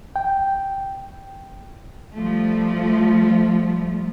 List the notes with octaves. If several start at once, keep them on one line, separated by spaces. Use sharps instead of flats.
G5
F3 G3 A3